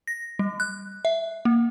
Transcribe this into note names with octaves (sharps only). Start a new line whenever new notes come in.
A#6
G3
F#6
E5
A#3